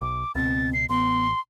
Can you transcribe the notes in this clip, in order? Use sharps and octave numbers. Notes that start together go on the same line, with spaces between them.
B1 D6
C#2 B2 C4 A6
C7
A1 B3 C6